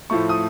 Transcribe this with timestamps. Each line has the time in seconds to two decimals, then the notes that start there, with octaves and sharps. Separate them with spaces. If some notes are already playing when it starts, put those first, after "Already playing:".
0.10 A2 F3 A3 C#6
0.29 D#6